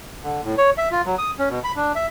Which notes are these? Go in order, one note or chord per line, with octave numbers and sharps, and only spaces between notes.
D3
A2
C#5
E5
F4
F#3
D#6
C#4
B2
B5
D4
E5